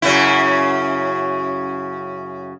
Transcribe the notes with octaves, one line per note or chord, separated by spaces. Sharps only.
F#2 C#3 E4